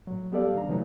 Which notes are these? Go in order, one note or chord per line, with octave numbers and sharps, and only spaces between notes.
A2 F#3
G3 B3 G4 A4 D5 F5
D#3 D4 A#5
C3 D#3 E3 F#3 A3 D#4